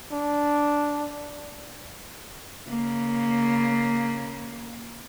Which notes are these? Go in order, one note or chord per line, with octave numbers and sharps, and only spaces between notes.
D4
C#3 A#3